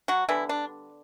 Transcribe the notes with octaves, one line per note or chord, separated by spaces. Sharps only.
F#3 F#4
D3 E3 G3 B3 E4
D4